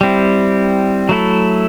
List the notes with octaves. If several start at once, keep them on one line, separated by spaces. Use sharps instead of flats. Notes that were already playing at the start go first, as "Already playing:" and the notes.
G3 C4 E4
F#3 A3 E4 A4